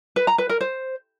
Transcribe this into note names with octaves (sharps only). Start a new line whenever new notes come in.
B4
A#5
B4
A#4
C5